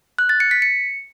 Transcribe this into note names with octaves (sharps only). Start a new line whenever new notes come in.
F#6
A6
C#7
B6
C#7